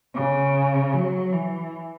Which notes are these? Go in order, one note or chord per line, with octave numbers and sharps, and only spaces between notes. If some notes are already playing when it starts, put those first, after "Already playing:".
C#3
F#3
E3